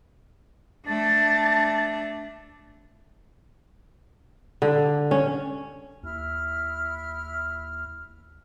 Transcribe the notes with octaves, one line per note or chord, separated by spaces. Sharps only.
A3 D4 A6
D3
C#4
D#2 E4 F6